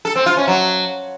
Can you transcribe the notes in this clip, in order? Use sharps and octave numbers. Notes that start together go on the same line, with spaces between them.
A4
C4
F4
C#4
F#3